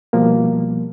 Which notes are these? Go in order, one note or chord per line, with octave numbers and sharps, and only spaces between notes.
B2 F3 G3 A#3